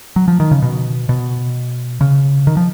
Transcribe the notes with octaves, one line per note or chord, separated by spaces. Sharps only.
F#3
F3
D#3
C#3
B2
B2
C#3
D#3
F3